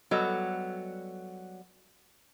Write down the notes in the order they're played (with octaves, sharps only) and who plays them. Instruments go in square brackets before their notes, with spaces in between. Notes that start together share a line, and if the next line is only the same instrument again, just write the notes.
[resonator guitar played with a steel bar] F#3 G3 B3 A4 D#5